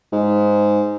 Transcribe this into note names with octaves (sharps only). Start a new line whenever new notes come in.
G#2